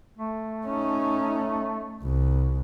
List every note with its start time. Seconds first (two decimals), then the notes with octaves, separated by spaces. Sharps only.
0.18 A3
0.66 C#4 D#4
2.02 C2